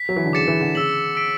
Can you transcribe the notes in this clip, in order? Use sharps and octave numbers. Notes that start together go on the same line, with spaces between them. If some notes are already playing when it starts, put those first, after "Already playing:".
Already playing: B6
F#3
E3
D3
C#3 D6 A6 C#7 E7
E3
D3
C#3 E6 B6 F#7
E6 B6 D7